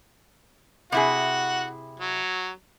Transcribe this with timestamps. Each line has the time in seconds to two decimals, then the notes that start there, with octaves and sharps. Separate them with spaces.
0.92 C3 E4 F#4 G#4 F#5
2.00 F#3